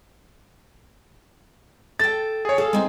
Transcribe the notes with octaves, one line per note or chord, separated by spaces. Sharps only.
A4 G5 A6
G#4 C#5
G#4 A4 F5
G#3 C4 D#4